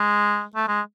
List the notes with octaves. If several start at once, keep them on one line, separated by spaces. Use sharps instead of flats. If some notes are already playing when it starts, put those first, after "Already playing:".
Already playing: G#3
A3
G#3